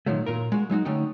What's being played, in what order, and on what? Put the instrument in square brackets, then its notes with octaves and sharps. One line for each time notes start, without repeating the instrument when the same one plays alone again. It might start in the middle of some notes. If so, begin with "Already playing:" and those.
[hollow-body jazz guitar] A#2 D#3 F3 F#3 A3
A#2 F4 A#4
G#3 F#4
F#3 G#3 D#4 F#4
D3 A3 C#4 D#4 G5